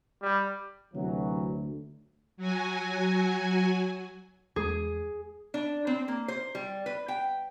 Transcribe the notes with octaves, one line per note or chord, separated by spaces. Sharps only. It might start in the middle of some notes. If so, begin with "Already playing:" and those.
G3
D2 C3 E3 F#3
F#3 F#4 G#5
E2 G#3 G#4
D4
C4
A#3
C5
G3
B4
G5